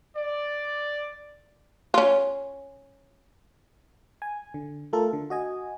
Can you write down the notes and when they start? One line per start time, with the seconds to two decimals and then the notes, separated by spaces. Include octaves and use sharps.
0.16 D5
1.94 C#4 F4
4.22 G#5
4.54 D3
4.93 A3 F4 A4 A#4
5.13 D3
5.30 F#4 D#5 G#5